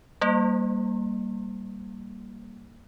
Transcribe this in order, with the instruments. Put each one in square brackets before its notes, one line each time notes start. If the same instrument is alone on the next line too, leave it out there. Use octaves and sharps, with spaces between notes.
[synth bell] G3 A#3